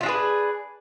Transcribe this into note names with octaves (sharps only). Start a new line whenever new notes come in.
D4 F4 G#4 B4